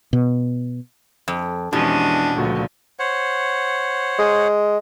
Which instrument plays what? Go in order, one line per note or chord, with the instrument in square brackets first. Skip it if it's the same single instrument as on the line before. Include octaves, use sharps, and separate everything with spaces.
[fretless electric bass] B2
[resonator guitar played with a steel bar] F2
[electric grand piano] F2 E4 G4 [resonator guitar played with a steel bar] B2 [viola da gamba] E3 G#3 C#4 [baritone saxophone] D4
[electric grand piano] C#2 A3 F#4 [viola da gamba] A#2 D3 F3
[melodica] C5 C#5 F#5
[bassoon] G#3